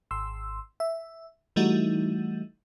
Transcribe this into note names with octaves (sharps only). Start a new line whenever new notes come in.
G#1 C6 E6
E5
E3 G3 A3 D#4 E4 F#4